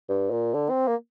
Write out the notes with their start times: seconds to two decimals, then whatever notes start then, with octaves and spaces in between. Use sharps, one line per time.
0.09 G2
0.31 A#2
0.54 D3
0.70 C4
0.88 A#3